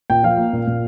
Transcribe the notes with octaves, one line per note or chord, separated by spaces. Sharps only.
A#2 G5
F3 F5
A#3
A#2
A#2